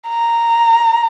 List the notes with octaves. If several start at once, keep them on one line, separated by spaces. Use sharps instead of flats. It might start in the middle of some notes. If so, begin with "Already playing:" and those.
A#5